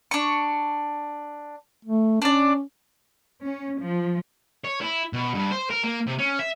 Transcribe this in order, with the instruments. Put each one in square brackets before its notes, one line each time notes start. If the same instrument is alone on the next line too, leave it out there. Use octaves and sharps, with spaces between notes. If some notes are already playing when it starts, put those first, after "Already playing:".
[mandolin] D4 C#6
[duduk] A3
[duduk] C#4 [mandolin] D4 D5
[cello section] C#4
F3
[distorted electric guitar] C#5
E4
B2
G2
C5
A#4
A#3
C3
C#4
E5